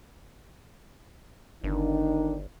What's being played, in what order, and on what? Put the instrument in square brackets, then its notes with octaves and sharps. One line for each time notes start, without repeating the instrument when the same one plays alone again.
[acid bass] G1 [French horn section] D#3 D4 D#4